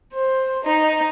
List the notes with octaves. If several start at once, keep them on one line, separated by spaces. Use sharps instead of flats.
C5
D#4